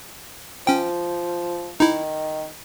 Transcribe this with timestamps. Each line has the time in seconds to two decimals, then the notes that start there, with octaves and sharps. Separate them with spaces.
0.67 F3 C#4 G5
1.80 D#3 D#4 E4